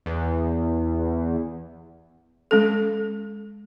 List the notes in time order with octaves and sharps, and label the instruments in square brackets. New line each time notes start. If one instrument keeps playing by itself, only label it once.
[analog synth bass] E2
[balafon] G#3 C#4 A4